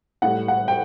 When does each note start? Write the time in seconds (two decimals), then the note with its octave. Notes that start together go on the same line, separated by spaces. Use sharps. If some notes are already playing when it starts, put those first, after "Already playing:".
0.22 A2 G3 F#5
0.48 F#5
0.68 G5